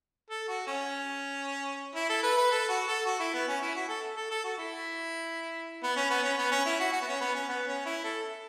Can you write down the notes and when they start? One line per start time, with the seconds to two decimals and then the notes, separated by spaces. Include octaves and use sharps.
0.30 A4
0.48 F#4
0.67 C#4
1.95 E4
2.09 A4
2.23 B4
2.37 B4
2.51 A4
2.69 F#4
2.88 A4
3.06 F#4
3.20 E4
3.34 B3
3.48 C#4
3.62 E4
3.75 F#4
3.89 A4
4.17 A4
4.30 A4
4.44 F#4
4.58 E4
5.83 B3
5.96 C#4
6.10 B3
6.24 C#4
6.38 B3
6.52 C#4
6.66 E4
6.80 F#4
6.93 F#4
7.02 B3
7.07 C#4
7.21 B3
7.35 C#4
7.49 B3
7.67 C#4
7.85 E4
8.04 A4